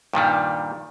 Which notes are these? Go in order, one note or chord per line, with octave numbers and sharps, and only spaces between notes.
G2 A#2 D#3 G3